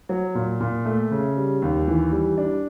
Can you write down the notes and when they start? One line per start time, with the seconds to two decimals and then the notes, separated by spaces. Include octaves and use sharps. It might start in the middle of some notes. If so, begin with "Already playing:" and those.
0.09 F#3
0.35 A#2
0.60 A#2
0.85 A3
1.11 C#3
1.37 G3
1.62 D#2
1.88 E3
2.12 G3
2.38 D4